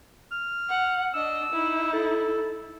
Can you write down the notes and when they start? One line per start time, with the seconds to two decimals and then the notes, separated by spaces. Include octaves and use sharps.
0.32 F6
0.69 F#5
1.14 D4 D#5 E6
1.52 D#4 E4
1.93 A4